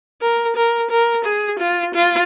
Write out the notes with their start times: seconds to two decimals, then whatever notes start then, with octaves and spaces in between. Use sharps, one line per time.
0.21 A#4
0.56 A#4
0.91 A#4
1.24 G#4
1.59 F4
1.94 F4